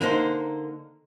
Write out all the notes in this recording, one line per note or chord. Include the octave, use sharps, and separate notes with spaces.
D3 A#3 D#4 C5